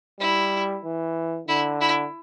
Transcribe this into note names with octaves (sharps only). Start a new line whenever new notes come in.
G3 E4
E3
D3 E4
E4